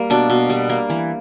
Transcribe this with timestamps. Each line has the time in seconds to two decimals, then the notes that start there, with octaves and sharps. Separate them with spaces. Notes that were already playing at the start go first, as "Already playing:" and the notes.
Already playing: G3 A#3
0.10 B2 D4
0.30 B2
0.50 G3
0.69 A#3
0.90 E3